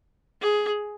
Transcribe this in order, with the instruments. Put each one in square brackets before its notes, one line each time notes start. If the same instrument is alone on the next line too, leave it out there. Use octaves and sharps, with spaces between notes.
[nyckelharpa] G#4